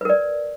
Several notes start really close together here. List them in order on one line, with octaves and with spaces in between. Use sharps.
B4 A#4 D5